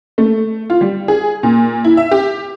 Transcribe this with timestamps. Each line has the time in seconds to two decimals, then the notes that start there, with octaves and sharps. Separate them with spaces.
0.18 A3
0.70 F4
0.81 G3
1.08 G#4
1.43 A#2
1.85 E4
1.97 E5
2.11 G4